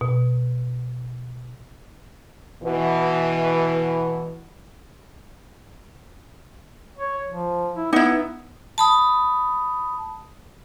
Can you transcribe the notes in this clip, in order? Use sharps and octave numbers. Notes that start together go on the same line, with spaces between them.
B2
B2 E3
C#5
F3
E4
B3 D#4 E4
A5 B5 D#6